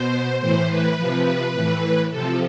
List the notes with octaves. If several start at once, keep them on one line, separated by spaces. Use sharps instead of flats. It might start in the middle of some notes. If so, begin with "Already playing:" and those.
Already playing: B2 C5
A2 E3 C5
B4
C3 F3
A2 E3
C3 F3 A4